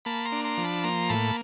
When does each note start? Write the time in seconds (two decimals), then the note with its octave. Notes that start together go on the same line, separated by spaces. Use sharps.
0.05 A#3 A5 B5
0.25 A#5 C6
0.32 D4
0.44 A#5 C6
0.58 F3
0.64 A5 B5
0.84 A#3 A#5 C6
1.09 A2 A5 B5